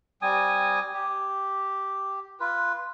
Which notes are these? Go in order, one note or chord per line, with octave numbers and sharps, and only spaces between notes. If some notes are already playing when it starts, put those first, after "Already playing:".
G3 C4 G#5 D#6
G4
F4 B4